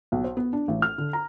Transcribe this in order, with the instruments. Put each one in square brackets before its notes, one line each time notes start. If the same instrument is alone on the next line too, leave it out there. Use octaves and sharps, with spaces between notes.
[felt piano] B1
C5
B3
D4
A1
F6
D3
A#5